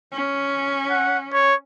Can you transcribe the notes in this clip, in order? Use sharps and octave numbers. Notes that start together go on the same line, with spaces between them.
C#4
F#5
C#5